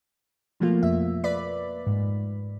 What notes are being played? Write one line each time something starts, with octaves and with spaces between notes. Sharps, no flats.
B2 F3 A3 A#3 F4
F2 E5
B4 D5 B5
G#2